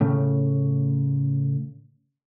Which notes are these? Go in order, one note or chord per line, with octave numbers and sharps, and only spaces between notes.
A2 C#3